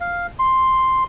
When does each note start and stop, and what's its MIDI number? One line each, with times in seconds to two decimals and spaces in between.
0.01 0.27 77
0.39 1.03 84